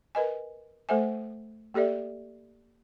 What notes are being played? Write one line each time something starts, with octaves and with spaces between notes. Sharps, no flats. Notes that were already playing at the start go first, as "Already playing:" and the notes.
A#4 B4 D#5 G#5
A3 A4 C5 E5 G#5
A#3 G4 A4 D5 E5